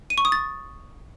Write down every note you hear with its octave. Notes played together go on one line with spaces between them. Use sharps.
D#7
C#6
D#6
A6